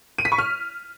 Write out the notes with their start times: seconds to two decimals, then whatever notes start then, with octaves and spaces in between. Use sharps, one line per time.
0.18 D#7
0.25 B6
0.32 C#6
0.38 F6